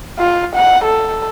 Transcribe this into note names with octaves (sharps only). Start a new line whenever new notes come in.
F4
F#5
A4